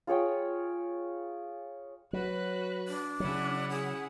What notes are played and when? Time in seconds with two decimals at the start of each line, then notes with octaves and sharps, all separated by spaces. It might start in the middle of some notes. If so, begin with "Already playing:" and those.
0.07 F4 G#4 C#5 G5
2.13 F#3 F#4 B4 F#6
2.88 D4
3.20 C#3 F#3 C#4 E4 F#5
3.70 G#4